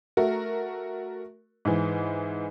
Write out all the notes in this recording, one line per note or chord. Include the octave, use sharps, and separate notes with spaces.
A3 F#4 A#4
G#2 E3